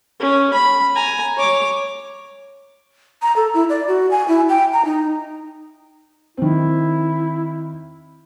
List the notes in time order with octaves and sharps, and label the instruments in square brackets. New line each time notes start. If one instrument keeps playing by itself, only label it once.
[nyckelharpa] C#4
B5
G#5 A#5
C#5 D6
[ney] A#5
A4
E4
D5
F#4
G#5
E4
G5
A#5
D#4
[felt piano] D#3 C4 [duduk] E4